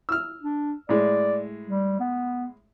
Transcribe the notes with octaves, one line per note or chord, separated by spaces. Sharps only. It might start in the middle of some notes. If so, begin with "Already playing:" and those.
E6 F6
D4
A2 G#3 D5
G3
B3